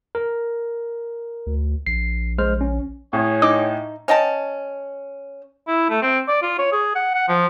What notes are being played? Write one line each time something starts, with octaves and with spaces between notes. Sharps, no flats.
A#4
D2
A#1 C7
G#3 C5 F6
C#4
A2 G#4 C#5
D#4 D6
C#4 D#5 G5 A5
E4
A3
C4
D5
F4
C#5
G#4
F#5
F#5
F3